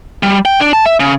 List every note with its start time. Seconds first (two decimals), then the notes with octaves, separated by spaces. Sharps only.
0.23 G3
0.45 G5
0.61 D4
0.73 A5
0.86 E5
1.00 C#3